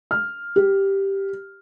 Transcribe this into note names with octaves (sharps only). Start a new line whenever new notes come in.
F6
G4